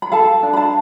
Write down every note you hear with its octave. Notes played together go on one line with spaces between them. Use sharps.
B5
A4 F5 A5
D4
B5
F5 A5